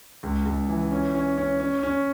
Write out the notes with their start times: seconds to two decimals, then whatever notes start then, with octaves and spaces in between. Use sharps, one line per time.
0.23 C#2
0.46 C#2
0.69 E3
0.91 C#4
1.15 C#4
1.38 C#4
1.60 C#4
1.83 C#4